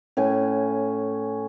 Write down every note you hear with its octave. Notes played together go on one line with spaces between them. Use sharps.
A2 C#4 G#5 D6